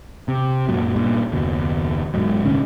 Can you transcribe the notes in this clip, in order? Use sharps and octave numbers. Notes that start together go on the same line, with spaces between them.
C3
F#2 A#2 F#3
G2 A#2
F#1 D#2 B2
E1 G#2 F#3
C#2 A2 D#3 C#4